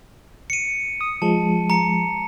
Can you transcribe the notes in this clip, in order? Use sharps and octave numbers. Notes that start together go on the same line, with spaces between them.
C#7 D#7
D#6
F3 G#3 A5
A#5 C#7